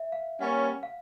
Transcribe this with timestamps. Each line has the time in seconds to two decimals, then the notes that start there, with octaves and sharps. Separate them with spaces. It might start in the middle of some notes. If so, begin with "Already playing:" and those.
Already playing: E5
0.12 F5
0.40 G3 A#3 C#4 F#5
0.83 F5